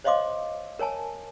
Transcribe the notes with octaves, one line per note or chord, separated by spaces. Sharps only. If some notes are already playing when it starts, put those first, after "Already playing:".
C5 C#5 D#5 F5 C6 D6
A#4 C#5 G#5 A5